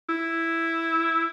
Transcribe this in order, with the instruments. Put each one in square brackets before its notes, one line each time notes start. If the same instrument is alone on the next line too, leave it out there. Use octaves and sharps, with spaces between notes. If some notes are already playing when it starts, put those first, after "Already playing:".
[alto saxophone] E4